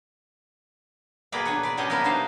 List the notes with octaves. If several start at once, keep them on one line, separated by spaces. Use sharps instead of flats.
B2 A#3 G#4 B4 D5 A#5
D4 C#5 F#5
B4 D5
B2 G3 C#4 G4 D#5
A#3 B3 E4 A#4 B4
A#3 D4 D#4 F#4 C5 F5